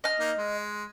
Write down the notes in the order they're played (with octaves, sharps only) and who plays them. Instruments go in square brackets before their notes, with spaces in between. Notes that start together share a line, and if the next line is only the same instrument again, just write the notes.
[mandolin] D#5 F6
[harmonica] A#3 D#4
G#3